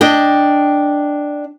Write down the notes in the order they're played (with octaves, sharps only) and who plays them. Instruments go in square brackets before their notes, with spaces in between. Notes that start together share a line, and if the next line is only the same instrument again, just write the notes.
[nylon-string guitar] D4 D#5 G5